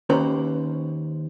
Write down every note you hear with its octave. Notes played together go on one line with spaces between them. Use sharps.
D#2 C#4 B4 C5 A#5